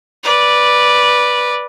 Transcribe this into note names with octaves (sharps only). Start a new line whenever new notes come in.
B4 D5